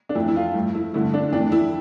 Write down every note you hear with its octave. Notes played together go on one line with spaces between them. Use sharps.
D4
F2 E3 A3 E4
E4
F4
G2 F3 A3
E4
G2 D3 A3 E4
D4
F2 E3 A3 D4
E4